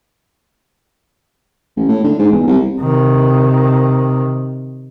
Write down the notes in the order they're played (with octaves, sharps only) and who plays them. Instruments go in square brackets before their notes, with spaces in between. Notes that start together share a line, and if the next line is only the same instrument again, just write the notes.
[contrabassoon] A1
A2
D3
G#2
E2
C2
[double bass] C3 D#3